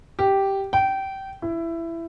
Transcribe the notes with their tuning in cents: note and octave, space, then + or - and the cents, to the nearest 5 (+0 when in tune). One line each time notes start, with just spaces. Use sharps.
G4 -5
G5 -20
E4 +15